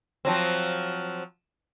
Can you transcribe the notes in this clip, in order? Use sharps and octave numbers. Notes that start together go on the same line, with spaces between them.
F3 F#3 C4